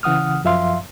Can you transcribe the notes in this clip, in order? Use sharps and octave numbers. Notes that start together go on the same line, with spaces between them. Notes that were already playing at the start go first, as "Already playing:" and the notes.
C#3 E3 F#5 D#6 F6
F#2 F3 E5 F5 C6